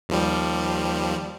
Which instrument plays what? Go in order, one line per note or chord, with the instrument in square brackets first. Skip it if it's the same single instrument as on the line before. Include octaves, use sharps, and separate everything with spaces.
[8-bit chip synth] D#2 F3 G3